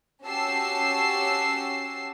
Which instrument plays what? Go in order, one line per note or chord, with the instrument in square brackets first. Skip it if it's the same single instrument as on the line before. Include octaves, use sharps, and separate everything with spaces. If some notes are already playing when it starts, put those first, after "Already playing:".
[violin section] C#4 F#4 G4 A5 E6 C7